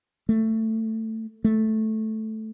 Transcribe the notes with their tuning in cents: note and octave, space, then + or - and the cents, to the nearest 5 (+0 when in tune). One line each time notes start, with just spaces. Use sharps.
A3 +15
A3 -5